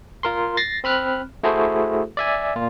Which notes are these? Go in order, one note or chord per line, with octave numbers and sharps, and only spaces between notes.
F4 A#4 C6
A6 A#6 C7
C4 B5 F6 F#6
A3 E4 F#4 G#4 A4 C5
D5 E5 G#5
A#2 F4